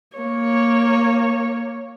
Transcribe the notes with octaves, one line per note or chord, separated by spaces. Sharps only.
A#3 C#5